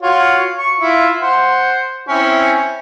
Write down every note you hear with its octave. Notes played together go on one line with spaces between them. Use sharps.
F4 F#4 C#5
C#6
E4 F4
C5 F#5
C4 C#4 E4